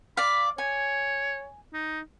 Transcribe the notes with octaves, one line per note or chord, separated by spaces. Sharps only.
D5 F5 B5
C#5 G#5
D#4